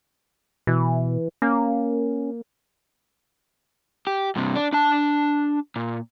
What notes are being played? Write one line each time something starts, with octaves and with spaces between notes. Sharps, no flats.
B2 E3
A#3 C#4
G4
G2 C3
D4
D4 A5
A#2